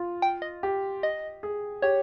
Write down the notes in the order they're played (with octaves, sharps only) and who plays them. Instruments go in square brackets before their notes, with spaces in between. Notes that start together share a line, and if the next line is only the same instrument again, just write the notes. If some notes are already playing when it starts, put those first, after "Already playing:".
Already playing: [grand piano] F4
[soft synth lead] G5
D#5
[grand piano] G4
[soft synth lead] D#5
[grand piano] G#4
[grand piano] G4 [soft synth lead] C#5